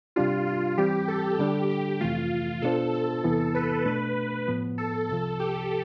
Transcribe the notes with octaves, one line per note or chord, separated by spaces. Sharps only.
C3 G3 D4 F4 G4
F4
E3 G3 C4 G4
A4
D3 G3 D4 G4 A4
G4
F2 C3 E3 A3 F4
B2 B3 D4 F4 A4 C5
A4
E2 C3 E3 B3 E4
B4
B2 A3 D4 B4
A2 F3 B3
A4
C2 C3 F3 A4
G4